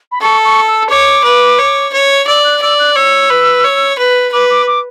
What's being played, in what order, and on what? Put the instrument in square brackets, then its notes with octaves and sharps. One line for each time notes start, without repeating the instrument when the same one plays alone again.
[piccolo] B5
[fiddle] A4 [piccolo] C#6
[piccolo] C#6
E6
[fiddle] C#5 [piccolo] D6
[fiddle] B4
C#5
C#5
[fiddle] D5 [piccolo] E6
[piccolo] F#6
[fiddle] D5 [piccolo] E6
[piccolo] F#6
[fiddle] C#5 [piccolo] E6
[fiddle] B4
C#5
B4
[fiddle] B4 [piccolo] D6
[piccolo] D6
D6